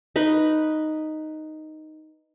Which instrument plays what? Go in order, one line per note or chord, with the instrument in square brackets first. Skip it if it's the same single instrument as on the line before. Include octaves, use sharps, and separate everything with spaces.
[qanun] D#4 B4 B5